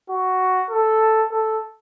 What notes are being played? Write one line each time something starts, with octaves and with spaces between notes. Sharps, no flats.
F#4
A4
A4